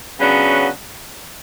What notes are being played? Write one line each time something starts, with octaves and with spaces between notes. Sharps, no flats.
C#3 F#3 B3 D4 F#4